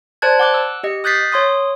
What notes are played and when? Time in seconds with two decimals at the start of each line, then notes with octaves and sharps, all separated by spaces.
0.22 C5 D5 A5 F#6 G#6
0.39 F#5 D6 F#6
0.54 E6
0.83 G4 D#5 C#7
1.04 D#6 F#6 G6 A6 B6 C7
1.32 C#5 C6 D#6